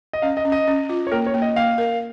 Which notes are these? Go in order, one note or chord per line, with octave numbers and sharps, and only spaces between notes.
D#5
C#4 F5
D#5
C#4
D#5
C#4
F4
C#5
A#3 A#4
C#5
A#3
D#5
A#3 F5
A#4